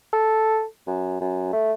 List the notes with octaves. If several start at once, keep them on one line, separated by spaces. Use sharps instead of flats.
A4
F#2
F#2
A3